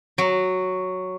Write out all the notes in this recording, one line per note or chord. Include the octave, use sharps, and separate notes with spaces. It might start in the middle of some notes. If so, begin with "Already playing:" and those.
F#3